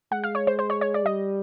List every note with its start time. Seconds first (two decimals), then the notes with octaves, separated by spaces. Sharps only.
0.12 G#3 F#5
0.24 F5
0.35 C#5
0.47 C5
0.59 C5
0.70 C#5
0.81 C#5
0.94 D5
1.05 G3 D#5